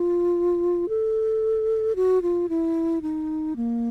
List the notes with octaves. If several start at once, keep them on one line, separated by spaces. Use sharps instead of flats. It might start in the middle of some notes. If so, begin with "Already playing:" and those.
Already playing: F4
A4
F#4
F4
E4
D#4
A#3